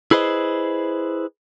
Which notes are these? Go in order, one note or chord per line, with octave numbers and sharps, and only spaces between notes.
E4 G#4 B4 C5 D#5